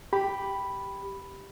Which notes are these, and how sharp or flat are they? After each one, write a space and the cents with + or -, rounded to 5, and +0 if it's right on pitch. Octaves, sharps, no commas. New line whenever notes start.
G4 +0 B5 +0